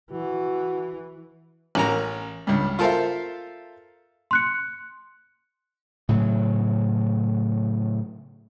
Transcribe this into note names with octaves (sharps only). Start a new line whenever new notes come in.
E3 F#4
A1 C#4 A#4 A#5
C#2 G2
F4 A4 A#4 C5 E5 F5
C6 F#6 C#7
A2 C#3 F#3